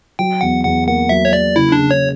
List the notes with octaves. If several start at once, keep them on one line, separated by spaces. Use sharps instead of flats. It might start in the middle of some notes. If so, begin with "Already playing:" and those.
F#3 G5
E2 F#5
E2 F#5
A#3 F#5
F#3 E5
C#5
A#3 D5
C#3 E4
D4
C#3
C#5